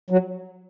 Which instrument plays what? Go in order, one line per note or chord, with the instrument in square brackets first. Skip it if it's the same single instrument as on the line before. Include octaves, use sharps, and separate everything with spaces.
[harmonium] F#3